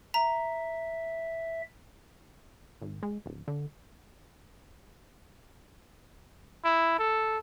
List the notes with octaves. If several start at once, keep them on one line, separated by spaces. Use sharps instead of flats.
E5 A#5
G#1
G#3
D1
D3
E4
A4